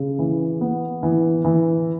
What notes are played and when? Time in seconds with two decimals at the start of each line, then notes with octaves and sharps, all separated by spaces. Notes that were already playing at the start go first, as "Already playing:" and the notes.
Already playing: C#3
0.19 E3
0.61 B3
1.03 E3
1.44 E3